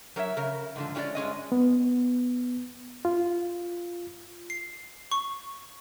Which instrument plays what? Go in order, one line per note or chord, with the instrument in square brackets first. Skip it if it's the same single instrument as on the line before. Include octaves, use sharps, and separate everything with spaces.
[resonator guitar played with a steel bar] F#3 A#4 C#5 E5
C#3 A#4
G#2 D3 F3
G#3 C#4 F#4 G4 D5 D#5
G2 G#3 C#4 D#5
[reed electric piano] B3
F4
[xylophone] C7
C#6